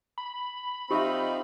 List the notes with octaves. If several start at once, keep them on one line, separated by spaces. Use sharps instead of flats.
B5
F3 C4 D#4 G4 E5